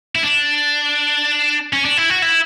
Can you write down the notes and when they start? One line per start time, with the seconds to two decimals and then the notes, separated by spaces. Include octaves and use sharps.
0.15 E4
0.23 D4
1.73 C#4
1.85 D4
1.97 E4
2.10 F#4
2.22 E4